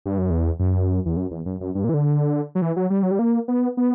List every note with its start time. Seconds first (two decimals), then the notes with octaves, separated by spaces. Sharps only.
0.06 G2
0.18 F#2
0.30 E2
0.59 F#2
1.06 E2
1.17 F#2
1.31 E2
1.46 F#2
1.61 F#2
1.75 G2
1.84 A#2
1.89 E3
1.94 D3
2.55 F#3
2.62 E3
2.76 F#3
2.90 G3
3.03 F#3
3.11 G3
3.19 A#3
3.48 B3
3.77 B3